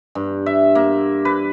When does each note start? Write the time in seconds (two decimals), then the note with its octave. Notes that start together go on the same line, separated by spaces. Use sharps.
0.15 G2
0.46 E5
0.75 A#3
1.25 B4